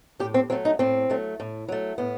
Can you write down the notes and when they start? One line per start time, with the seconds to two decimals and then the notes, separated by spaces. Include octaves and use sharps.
0.19 A2 G4
0.34 C4
0.50 F#3 A3 C4
0.65 D#4
0.79 A2 C4
1.10 F#3 A3
1.40 A2
1.68 F#3 A3
1.98 A2 B3